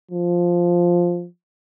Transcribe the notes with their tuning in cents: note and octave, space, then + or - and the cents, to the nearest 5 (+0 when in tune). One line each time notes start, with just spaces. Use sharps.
F3 +0